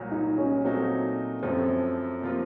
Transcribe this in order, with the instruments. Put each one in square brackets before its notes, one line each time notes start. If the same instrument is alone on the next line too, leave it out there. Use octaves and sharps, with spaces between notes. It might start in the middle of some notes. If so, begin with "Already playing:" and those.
Already playing: [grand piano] C2 A#2 F#3
[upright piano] D#4
C#4
[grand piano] A#2 F#3 A3 D#4 F#4 [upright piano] C4
[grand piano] F#2 F3 A3 C#4 [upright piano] C4
[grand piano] C3 F3 A#3 F4